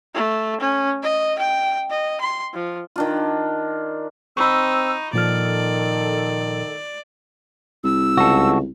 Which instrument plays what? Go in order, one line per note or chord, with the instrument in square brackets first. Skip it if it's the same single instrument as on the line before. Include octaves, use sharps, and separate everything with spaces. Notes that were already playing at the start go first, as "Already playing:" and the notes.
[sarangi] A3
C#4
D#5
G5
D#5
C6
F3
[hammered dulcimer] D#3 D4 F4
[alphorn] C4 [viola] D#4 [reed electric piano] B5 C#6 [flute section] E6
[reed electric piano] A#2 F3 F6 [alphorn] D#3 [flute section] A4 [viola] D5
[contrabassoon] C2 [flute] E6
[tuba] C#2 [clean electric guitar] F#4 A4